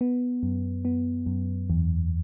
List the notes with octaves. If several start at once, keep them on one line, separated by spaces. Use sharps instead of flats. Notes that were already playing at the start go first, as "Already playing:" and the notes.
B3
F#2
B3
F#2
E2